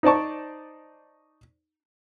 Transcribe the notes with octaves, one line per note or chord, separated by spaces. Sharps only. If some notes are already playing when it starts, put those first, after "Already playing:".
D#4 C5 D5 A5 C#6